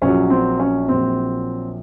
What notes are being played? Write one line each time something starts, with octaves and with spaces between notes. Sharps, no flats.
A#1 A#2 F#3 C#4
C4
C#4
A#1 A#2 F#3 C4